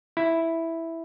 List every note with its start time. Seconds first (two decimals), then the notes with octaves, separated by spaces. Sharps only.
0.17 E4